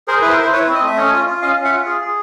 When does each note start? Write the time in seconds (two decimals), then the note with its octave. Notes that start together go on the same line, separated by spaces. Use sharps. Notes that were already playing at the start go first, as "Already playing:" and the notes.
0.08 G#4 A#4 C5
0.21 E4 B4
0.30 A#4 C5
0.37 E4
0.42 C5
0.52 E4 B4 C#5
0.67 C4
0.75 D#5
0.82 A3 E5
0.97 C#4 C#5 D#5
1.13 F4
1.27 F4
1.42 C#4 D#5 F5
1.57 C#4
1.64 E5 F#5
1.71 F4
1.86 G#4
2.01 G#4